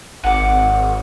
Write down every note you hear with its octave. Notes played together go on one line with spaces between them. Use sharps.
G#1 F#5 D6